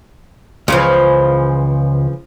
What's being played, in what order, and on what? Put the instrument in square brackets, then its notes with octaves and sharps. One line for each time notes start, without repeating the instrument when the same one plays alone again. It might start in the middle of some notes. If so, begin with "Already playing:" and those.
[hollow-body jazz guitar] C#2 [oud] C#3 E3 F3